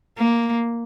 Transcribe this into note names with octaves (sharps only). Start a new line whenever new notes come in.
A#3